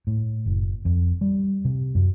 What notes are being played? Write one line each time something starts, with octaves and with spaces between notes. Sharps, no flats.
A2
F#1
F2
G3
C3
F#2